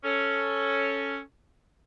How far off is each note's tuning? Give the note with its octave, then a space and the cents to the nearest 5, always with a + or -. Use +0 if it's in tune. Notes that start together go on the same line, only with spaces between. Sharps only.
C#4 +0 A4 +0